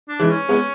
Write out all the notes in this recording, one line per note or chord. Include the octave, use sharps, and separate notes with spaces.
D4
E3 G#3
C#4
G#3 B3